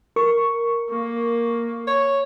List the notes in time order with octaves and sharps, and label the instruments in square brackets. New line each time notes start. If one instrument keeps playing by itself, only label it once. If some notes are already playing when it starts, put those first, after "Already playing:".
[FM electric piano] A#4 C#6
[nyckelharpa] A#3
[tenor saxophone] C#5